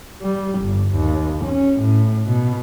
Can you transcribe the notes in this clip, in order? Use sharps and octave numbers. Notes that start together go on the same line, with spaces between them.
G3
G1
D#2
C#4
A2
B2